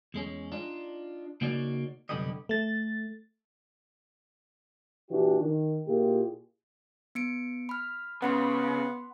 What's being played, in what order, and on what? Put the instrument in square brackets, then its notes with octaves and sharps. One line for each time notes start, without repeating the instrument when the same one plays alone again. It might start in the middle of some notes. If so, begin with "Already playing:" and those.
[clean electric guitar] E2 G#3 C#4
D4 D#4 F4
C#3 A#3 D#4 F#4 C#5 D5
C2 F#2 D3 B3 G4 D#5
[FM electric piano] A3 A6
[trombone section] A#2 E3 D4 F#4 G4
D#3
A#2 A#3 E4 F4 G4 G#4
[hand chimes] B3 C#7 D7
B5 F6
[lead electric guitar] C#3 [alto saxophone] B3 [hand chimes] F#5 B5 C6